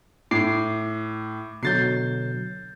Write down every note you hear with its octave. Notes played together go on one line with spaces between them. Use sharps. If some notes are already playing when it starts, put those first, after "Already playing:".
A2 D6 C7
B2 D3 F#3 G6 A6 C7